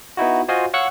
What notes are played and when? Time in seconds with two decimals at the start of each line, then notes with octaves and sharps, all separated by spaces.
0.17 B3 D#4 E4 F#4
0.48 F4 F#4 C5 D#5 F5 G#5
0.74 C#5 F5 F#5 C#6 E6 F#6